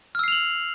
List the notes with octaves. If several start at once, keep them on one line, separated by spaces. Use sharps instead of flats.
E6 F6 C7 F7 F#7